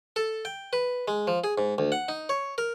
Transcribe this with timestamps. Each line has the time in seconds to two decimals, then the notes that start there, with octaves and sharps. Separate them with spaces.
0.16 A4
0.45 G5
0.73 B4
1.08 G#3
1.27 F3
1.44 G#4
1.58 G#2
1.78 D2
1.92 F#5
2.09 D#4
2.29 C#5
2.58 A#4